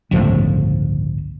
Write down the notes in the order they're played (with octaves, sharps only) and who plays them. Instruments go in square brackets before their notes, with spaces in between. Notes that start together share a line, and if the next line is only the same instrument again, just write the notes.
[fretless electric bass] G1 C#2 A2 F3